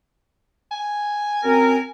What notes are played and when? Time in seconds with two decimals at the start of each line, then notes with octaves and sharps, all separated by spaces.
0.71 G#5
1.44 F#2 C4 A#4